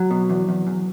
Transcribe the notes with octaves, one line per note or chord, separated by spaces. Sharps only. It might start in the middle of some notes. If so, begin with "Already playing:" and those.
Already playing: F#3
B2
E2
E2
E2